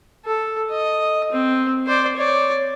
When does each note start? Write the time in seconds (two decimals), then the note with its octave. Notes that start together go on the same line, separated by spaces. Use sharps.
0.25 A4
0.71 D#5
1.32 C4
1.87 C5 D5
2.17 C#5 D5